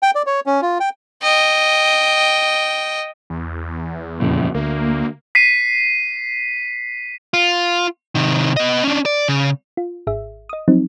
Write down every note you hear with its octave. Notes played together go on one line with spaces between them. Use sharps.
G5
D5
C#5
C#4
F4
G5
D#5 G5
E2
F2 A#2 C#3
D2 A#3
B6 C7 D#7
F4
C3 D#3
B3 D#5
C#4 D4
D5
C#3
F4
G#1 G#4 E5
D#5 D#6
F3 F#3 C4 D#4